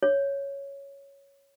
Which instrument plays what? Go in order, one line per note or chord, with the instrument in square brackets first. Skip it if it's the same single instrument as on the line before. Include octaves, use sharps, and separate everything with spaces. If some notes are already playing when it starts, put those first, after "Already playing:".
[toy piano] C#5